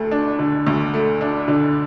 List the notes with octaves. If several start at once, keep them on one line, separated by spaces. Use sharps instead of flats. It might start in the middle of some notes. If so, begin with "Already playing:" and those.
Already playing: D2 A3
D4
D3
D2
A3
D4
D3